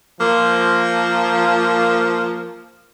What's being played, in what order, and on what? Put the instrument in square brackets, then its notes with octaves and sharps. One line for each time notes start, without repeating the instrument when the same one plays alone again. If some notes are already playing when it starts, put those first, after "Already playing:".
[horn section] F3 A#3